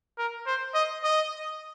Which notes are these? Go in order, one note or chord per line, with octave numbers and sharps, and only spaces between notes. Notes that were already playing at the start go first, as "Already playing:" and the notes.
A#4
C5
D#5
D#5